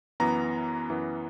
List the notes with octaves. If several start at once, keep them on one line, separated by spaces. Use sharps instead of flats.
F#2 E3 B3 A#5
F#2 E3 B3